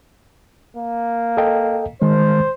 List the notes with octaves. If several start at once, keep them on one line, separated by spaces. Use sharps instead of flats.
A#3
A4 D#5 G5
D#3 G#3 C5